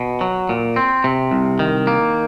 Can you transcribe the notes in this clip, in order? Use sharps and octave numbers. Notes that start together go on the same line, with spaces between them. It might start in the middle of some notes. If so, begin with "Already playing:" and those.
Already playing: B2
F#3
A#2
C4
C3
C2
D#3
A#3